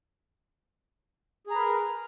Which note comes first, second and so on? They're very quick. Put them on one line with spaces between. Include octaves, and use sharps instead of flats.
G#4 A#5 B4 A#4